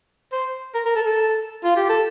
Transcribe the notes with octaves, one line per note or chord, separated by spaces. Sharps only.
C5
A#4
A#4
A4
A4
F4
G4
A4